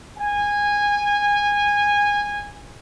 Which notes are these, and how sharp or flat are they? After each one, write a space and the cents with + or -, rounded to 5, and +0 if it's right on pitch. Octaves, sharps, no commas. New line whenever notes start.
G#5 -15